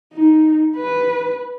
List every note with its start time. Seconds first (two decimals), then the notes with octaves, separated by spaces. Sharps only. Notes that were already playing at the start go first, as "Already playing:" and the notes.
0.14 D#4
0.77 B4